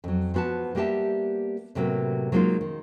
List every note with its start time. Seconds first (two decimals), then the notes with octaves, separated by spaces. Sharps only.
0.04 F2 F#3
0.34 F3 B3 F#4 B4 A5
0.75 G3 A#3 B3 G4 E5 A5
1.75 A2 C3 F#3 G3 A#3 B3
2.32 F#3 G#3 A#3 C4 D#4 F4
2.61 D#3